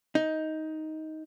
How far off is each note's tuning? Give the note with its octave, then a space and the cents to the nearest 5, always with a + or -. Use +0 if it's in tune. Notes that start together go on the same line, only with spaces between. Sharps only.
D#4 +10